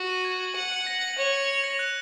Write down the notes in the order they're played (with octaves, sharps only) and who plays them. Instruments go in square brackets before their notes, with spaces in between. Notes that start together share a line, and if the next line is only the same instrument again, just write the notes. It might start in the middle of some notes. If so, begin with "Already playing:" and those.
Already playing: [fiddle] F#4
[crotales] D#7
G#6
F#7
[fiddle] F#5 [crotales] F#7
[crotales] C#7
A#6
F#7
[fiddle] C#5 [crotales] F#7
[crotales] C#7
C#7
A#6
F#6